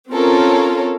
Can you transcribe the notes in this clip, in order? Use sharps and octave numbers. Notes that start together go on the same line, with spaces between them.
C4 C#4 F4 A4 A#4 C#5